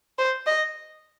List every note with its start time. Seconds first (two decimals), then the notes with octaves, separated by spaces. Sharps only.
0.18 C5
0.46 D#5